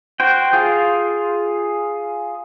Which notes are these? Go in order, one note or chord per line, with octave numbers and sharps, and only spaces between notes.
F#4 C5 G5
F4 G#4